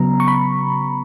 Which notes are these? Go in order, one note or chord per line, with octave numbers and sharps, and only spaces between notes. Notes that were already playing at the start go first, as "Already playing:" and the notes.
Already playing: C#3 F#3 B3 A#5
C#6
B5